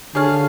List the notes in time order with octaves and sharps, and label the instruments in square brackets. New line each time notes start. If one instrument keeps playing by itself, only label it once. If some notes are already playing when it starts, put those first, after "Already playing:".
[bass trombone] D3 [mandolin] G#4 C#5 F5 A5